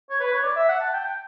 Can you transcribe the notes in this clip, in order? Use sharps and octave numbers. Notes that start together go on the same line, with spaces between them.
C#5
B4
C#5
D5
E5
F#5
A5
G5
G5